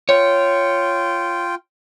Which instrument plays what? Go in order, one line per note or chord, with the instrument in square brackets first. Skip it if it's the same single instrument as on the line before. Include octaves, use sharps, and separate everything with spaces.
[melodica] F4 G5 [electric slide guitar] C#5